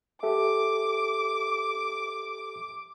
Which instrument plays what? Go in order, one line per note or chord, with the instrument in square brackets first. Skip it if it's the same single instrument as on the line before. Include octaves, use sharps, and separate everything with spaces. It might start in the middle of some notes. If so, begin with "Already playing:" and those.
[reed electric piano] G4 A4 E5 [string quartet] D6